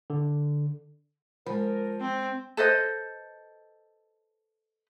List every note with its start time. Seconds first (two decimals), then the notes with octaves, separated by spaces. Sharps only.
0.10 D3
1.46 F3 G#3 A#4 B5
2.01 C4
2.57 A4 B4 C5 D#5